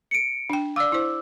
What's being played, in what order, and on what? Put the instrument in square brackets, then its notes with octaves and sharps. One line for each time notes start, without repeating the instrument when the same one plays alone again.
[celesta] C#7 D7
[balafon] D4 G5
[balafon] D5 F5 [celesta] D6 E6
[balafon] E4 C5